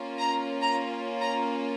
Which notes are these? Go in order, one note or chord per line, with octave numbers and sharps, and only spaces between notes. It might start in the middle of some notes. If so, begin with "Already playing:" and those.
Already playing: A#3 C#4 F4
A#5
A#5
A#5